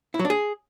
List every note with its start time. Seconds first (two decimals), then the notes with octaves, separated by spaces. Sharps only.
0.14 E4
0.19 F#3
0.25 D4
0.30 G#4